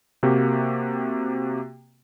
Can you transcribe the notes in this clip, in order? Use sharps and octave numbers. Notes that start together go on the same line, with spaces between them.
C3 A#3 F#4 G4